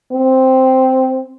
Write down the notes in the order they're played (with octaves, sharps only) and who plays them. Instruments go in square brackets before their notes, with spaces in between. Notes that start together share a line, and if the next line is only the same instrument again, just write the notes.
[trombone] C4